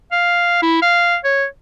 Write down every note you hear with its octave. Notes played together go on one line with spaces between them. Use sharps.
F5
E4
F5
C#5